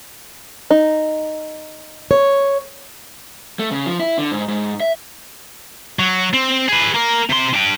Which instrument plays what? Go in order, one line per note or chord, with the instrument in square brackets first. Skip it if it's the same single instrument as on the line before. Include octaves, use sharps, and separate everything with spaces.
[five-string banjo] D#4
[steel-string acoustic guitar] C#5
[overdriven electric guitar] A3
C#3
F3
E4
D3
G#2
G#2
E5
[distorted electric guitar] F#3
C4
G#4 B4
A#3 A#4
C3 C6
D4 G5